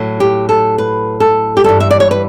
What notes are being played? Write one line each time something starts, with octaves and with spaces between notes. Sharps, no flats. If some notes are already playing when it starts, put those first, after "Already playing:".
Already playing: A2 F#3
G4
A4
B4
A4
G4
G2 E3 G3 A4
E5
D5
C#5
B4